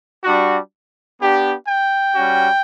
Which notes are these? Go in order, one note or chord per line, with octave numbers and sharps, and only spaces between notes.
G3 D4 F#4
B3 D4 G4
G5
G3 C#4 F#4